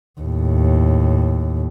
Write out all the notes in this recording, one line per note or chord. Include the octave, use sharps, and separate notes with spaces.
D#2 A2